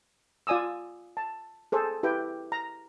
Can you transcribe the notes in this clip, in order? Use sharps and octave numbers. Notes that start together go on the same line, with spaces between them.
F4 D5 G#5 D#6 E6
A5
G#4 A4 C5
E4 G4 B4 G5
A#5